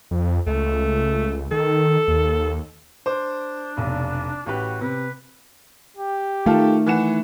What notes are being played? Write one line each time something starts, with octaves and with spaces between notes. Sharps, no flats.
F2
C#2 A3
D#3 A4
D#2
D4 C5 D6
F1 B1
A1 F#4 G4 B4
C3 B4
G4
D#3 A3 F4 A4 A#4
E3 F#5 E7